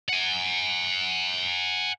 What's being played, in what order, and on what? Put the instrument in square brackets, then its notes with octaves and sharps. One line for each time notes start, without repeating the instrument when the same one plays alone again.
[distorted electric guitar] F#5 G#5